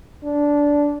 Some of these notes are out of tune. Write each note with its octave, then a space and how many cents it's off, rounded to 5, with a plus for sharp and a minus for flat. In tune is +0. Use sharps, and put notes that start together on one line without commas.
D4 -10